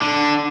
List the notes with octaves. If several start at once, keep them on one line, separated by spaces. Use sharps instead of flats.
D3